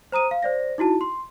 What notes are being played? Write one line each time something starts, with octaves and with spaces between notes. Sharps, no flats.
C5 A#5 D#6 D#7
F5
C5 D5 A#6
D#4 E4 F#4 A5
C6